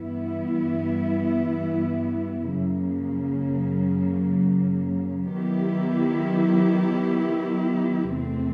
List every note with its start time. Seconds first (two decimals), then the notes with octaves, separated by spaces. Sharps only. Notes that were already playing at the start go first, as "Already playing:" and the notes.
Already playing: G2 E3 G3 B3 E4
2.52 F#2 C#3 F#3 A#3
5.32 D#3 F#3 B3 E4 G4
8.13 E2 C3 E3 A3 C4